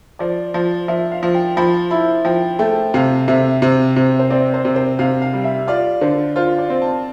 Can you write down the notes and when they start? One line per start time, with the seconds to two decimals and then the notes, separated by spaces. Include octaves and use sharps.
0.19 F3 D5
0.54 F3
0.88 F3 E5
1.11 F5
1.23 F3
1.35 G5
1.57 F3 B5
1.90 E4 B5
2.25 F3 G5
2.59 A3 G5
2.94 C3 F5
3.28 C3 E5
3.62 C3
3.96 C3
4.19 C5
4.30 C4 D5
4.54 C5
4.65 C3
4.76 C5
4.99 C3 F5
5.22 F5
5.33 G3
5.44 E5
5.67 F4 D5
6.01 D3 C5
6.36 F4 C5
6.58 D5
6.70 C4
6.82 A5